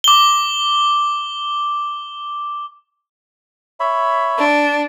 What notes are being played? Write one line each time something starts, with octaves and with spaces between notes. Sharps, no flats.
D6 G7
C#5 E5 B5
D4